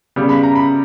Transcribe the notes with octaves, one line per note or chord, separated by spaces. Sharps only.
C#3 G3 B3
B5
A#5
B5